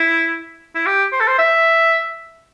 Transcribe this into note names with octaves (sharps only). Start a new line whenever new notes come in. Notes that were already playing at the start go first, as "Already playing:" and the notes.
Already playing: E4
E4
G4
C5
A4
C5
E5